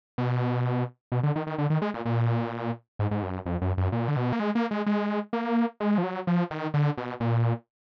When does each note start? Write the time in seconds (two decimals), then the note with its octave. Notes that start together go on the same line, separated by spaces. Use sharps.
0.18 B2
1.12 B2
1.23 D3
1.36 D#3
1.47 D#3
1.58 D3
1.70 D#3
1.82 G#3
1.94 A#2
2.05 A#2
2.99 G#2
3.11 G#2
3.23 F#2
3.46 F2
3.62 F#2
3.77 F#2
3.92 A#2
4.08 D3
4.17 B2
4.33 A#3
4.40 G#3
4.55 A#3
4.71 G#3
4.86 G#3
5.33 A#3
5.80 G#3
5.98 F3
6.03 F#3
6.27 F3
6.51 D#3
6.74 D3
6.97 B2
7.20 A#2